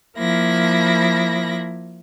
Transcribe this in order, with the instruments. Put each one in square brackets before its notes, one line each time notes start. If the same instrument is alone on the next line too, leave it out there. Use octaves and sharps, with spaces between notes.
[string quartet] F3 A#3 E4 A#6